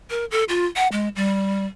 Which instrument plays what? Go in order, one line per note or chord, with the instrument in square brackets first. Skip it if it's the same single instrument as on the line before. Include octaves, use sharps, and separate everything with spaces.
[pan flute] A#4
A4
F4
F#5
G#3
G3